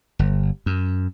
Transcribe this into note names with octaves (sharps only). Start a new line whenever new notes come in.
G1
F#2